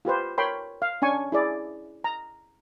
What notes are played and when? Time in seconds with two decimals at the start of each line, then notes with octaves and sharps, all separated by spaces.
0.05 F4 G4 B4 C5
0.38 A#4 C#5 G5 B5 C6
0.82 F5
1.02 C#4 D4 G#5 C#6
1.32 E4 G#4 D5
2.04 A#5